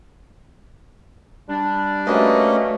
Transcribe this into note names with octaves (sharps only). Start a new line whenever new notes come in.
G3 D4
A3 A#3 C#4 F#4 B4 D#5